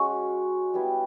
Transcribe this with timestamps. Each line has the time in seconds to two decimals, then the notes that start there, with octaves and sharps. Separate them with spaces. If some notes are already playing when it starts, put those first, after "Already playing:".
Already playing: G#3 C#4 F#4
0.74 G3 B3 E4